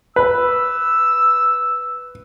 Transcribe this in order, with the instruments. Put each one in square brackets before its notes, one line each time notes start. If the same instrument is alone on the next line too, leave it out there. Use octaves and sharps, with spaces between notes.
[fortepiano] B4 [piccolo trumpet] E6